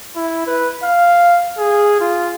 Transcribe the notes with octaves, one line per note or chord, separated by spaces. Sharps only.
E4
B4
F5
G#4
F4